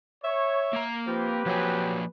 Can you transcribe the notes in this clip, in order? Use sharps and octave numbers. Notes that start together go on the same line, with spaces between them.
C#5 E5
A#3 A#5
F3 C4 G4 B4
F3 F#3 A#3 G#5